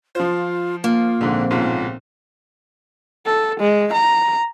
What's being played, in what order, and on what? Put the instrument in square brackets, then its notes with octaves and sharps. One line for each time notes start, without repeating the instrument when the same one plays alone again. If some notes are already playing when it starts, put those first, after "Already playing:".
[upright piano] F3 C5 [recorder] F4
[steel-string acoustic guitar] A#3 [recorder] F4
[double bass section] A#1 C4 [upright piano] G#2 D3
[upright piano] B1 G#2 C#3 [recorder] F4
[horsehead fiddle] A4
G#3
A#5